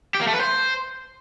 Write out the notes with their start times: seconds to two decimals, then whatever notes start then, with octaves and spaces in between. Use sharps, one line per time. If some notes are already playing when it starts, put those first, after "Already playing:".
0.15 G4
0.21 A#3
0.27 A3
0.34 B4
0.40 C5